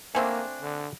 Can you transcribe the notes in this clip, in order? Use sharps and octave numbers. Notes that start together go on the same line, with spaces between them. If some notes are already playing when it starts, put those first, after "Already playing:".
A3 A#3 C4 D4 C5 G#5
D3